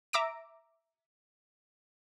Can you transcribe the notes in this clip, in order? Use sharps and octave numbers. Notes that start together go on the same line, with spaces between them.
E5 A#5 D6 E6 A#6 D7